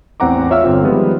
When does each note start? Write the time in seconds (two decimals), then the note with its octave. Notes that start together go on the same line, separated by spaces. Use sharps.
0.20 A1 E2 C4 F#5 A#5 D6
0.50 F4 C#5 E5 F5 E6 F6
0.64 G1 C4 F4
0.83 D#3 F3 G3 G#3 B3